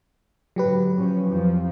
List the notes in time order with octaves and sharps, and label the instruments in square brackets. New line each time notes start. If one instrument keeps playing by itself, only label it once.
[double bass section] G#2 D3 [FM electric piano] F#3 G4 B4
[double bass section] F3 C#4
F2 F3